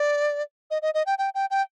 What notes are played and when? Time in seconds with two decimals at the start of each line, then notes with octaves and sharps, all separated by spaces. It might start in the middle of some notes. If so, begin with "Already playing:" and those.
Already playing: D5
0.71 D#5
0.82 D#5
0.94 D#5
1.06 G5
1.18 G5
1.35 G5
1.51 G5